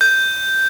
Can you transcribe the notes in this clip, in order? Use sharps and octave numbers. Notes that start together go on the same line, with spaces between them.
G6